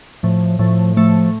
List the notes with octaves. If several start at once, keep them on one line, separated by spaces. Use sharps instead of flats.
A2 F3
A2 F3
F3 A3